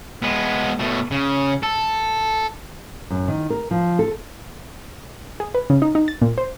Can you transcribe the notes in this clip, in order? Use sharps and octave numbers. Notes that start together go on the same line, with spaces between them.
G#3 B3
B2 A3
C#3
A4
F#2
D#3
A#4
F3
A4
G#4
B4
C#3
D#4
D#4
A6
A#2
C5